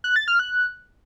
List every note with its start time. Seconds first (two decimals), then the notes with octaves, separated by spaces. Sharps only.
0.04 F#6
0.16 A6
0.28 F6
0.39 F#6